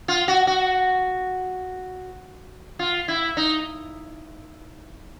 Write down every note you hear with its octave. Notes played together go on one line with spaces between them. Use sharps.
F4
F#4
F#4
F4
E4
D#4